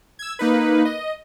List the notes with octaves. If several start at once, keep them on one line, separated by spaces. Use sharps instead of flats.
E6 G#6
A#3 D#4 B4
D#5